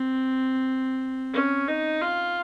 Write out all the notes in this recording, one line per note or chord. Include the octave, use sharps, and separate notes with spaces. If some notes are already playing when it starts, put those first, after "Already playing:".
Already playing: C4
C#4
D#4
F4